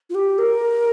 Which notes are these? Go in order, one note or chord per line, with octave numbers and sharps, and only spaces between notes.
F4
G4
A#4